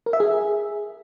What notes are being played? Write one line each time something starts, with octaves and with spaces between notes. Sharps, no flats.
A#4
E5
G#4